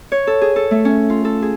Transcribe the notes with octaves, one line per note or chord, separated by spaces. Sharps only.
C#5
A4
G#4
A4
A3
C#4
F4
A4
G#4